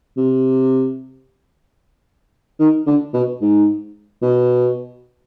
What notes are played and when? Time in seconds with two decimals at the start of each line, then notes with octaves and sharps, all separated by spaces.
0.17 C3
2.60 D#3
2.87 D3
3.14 B2
3.42 G#2
4.22 B2